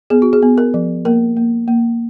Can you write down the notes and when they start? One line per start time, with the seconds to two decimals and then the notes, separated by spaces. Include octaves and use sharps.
0.10 B3 G#4
0.22 F#4
0.33 G#4
0.42 B3
0.58 A#4
0.74 F3
1.05 A#3 A#4
1.37 A#3
1.68 A#3